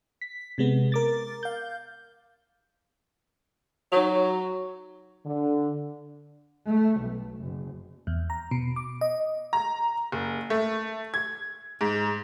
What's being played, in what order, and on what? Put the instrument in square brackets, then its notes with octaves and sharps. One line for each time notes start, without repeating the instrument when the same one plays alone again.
[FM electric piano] B6
C3 G#3 B3
A#4 D6 A6
F5 G6
[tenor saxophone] F#3 [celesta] D#4 C#5 F7
[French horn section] D3
[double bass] A3
B1
F#1
[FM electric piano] E2
A#5
B2
D6
D#5
[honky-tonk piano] A#5
F#1
A3
G#6
G#2